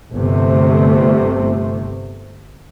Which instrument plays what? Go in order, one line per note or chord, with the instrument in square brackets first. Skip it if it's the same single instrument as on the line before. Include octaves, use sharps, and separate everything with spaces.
[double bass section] G1 C3 A3